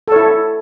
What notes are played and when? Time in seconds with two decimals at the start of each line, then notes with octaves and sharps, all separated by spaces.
0.08 A4
0.12 C#5
0.16 E4